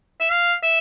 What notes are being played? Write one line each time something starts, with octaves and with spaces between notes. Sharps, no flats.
E5
F5
E5